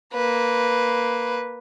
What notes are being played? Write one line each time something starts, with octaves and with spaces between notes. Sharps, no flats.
A#3 B4